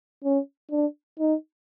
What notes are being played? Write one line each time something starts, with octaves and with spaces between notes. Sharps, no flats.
C#4
D4
D#4